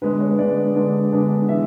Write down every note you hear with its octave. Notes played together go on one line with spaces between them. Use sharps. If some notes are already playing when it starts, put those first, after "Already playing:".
D3 G#3 B3 D4 B4
C#5
B4
D3 G#3 B3 D4 D5
D3 G#3 B3 D4
D3 G#3 B3 D4
E3 E5